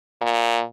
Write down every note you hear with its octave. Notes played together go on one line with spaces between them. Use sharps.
A#2